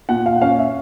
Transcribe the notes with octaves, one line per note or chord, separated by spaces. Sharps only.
A#2 F#5
F5
F#5
C#4 F5
E5